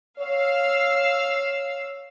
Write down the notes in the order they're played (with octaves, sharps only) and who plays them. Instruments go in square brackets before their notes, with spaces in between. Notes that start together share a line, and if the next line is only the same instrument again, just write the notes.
[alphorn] C#5 [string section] F5 E6